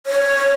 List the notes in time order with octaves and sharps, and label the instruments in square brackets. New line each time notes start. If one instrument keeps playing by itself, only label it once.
[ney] C#5